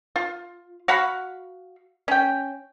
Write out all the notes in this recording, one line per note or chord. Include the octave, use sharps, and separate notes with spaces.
F4
F#4 F5 F#5 B5
C#4 G5